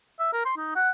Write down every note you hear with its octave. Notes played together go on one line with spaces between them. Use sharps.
E5
A#4
C6
D#4
F#5